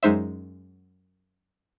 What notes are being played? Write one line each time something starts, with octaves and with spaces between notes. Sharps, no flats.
F#2 G#3 D#4 C5 E5